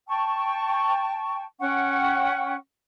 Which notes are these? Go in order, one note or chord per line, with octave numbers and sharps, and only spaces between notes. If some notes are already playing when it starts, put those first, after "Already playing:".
G5 A5 C#6
C#4 F#5 G5 C#6